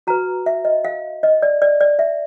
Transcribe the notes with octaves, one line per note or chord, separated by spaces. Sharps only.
F#4 B4 A#5
E5
D#5
F5
D#5
D5
D5
D5
E5